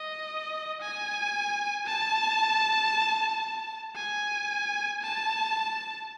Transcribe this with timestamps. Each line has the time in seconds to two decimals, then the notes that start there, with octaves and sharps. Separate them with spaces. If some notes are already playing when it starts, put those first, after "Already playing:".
Already playing: D#5
0.82 G#5
1.86 A5
3.96 G#5
5.03 A5